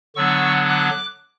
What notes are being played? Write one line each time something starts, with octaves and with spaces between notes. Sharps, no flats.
D3 F#3 B3 D4 C#6 E6
D6 F#6